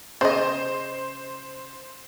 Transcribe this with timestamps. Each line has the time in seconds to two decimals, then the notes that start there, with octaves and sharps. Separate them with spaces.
0.21 C#3 C5 D#5